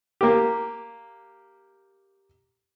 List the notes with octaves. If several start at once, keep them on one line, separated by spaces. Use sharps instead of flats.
A#3 G4